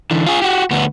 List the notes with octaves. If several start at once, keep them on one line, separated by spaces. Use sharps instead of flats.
D3 E3
F4 G#4
F#4 G4
D2 B3